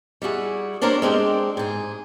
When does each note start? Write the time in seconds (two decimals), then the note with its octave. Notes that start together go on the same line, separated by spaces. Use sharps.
0.22 G3 E4 F#4 G#4
0.82 A#3 D4 G4 A#4 C5 C#5
1.02 G#3 C4 D4 G4
1.57 G#2 G#4